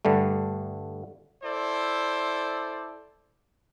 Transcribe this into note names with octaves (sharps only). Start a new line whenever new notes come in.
G2 D3 G3 A3
E4 A4 C5 D5